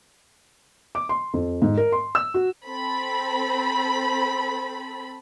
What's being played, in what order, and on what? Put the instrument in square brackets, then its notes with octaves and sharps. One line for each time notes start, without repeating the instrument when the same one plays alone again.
[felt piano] D6
C6
F2
G#2
A#4
C6
E6
F#4
[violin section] C4 A4 B5